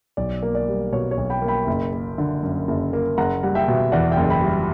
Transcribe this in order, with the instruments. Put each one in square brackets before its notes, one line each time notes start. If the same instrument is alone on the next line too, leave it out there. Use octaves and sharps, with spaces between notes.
[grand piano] B1 D5
A#3
D5
G3
B2 C#5
C#5
B1
G5 B5
A#3
G5 B5
F#1
A#3
D3
F#2
F#1
A#3
F#1 F#5 A#5
G3 F#5
E5 G5
B2
E2 D5 F#5
E5 G5
F#1
G5 B5
G3